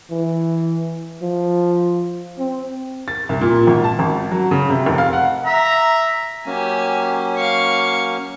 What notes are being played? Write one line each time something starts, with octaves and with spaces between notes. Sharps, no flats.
E3
F3
C4
A6
C2
A#2
G#1
A5
G#1
F#3
C#3
C3
F1
F5
F#5
E5 A#5
F#3 A#3 C#4 G4 G#5
F5 C#6